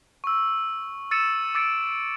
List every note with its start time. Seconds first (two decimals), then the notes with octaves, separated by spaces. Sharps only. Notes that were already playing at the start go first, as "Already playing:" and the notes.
0.24 C#6 E6
1.11 E6 A6 C#7 D#7 E7
1.55 D6 E6 A6 C#7 D7